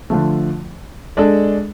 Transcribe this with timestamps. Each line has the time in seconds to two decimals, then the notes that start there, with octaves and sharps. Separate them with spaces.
0.10 D3 F3 A3
1.17 G#3 D4 A4